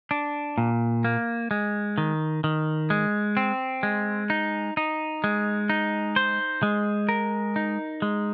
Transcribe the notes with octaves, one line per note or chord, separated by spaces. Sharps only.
D4
A#2
A#3
G#3
D#3
D#3
G#3
C4
G#3
D#4
D#4
G#3
D#4
C5
G#3
A#4
D#4
G#3